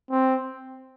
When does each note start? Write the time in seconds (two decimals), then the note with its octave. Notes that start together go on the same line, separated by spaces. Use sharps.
0.11 C4